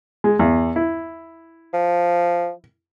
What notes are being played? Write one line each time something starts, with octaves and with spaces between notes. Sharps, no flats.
G#3
E2
E4
F3